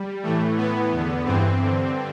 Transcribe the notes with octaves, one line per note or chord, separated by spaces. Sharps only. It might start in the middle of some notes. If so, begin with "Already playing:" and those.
Already playing: G3
A2 E3 A3
A2 E3 B3
E2 D3
G2 E3 C4
G2 D3